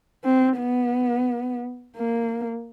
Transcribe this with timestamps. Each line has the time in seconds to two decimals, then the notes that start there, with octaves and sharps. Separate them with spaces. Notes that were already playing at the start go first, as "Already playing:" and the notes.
0.25 C4
0.59 B3
1.97 A#3